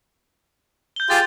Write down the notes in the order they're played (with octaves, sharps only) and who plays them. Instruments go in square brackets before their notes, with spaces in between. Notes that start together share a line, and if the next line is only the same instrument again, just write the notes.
[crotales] G6 G7
[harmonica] F4 G4 G#4 [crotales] A6